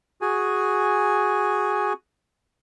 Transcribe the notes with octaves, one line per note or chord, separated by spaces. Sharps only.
F#4 G#4 G#5